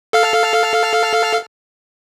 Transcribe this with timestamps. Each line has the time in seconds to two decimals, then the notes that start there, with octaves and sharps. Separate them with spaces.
0.13 A4 F5 F6